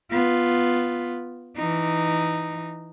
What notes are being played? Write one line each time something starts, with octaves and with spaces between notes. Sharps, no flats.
B3 F4
E3 D#4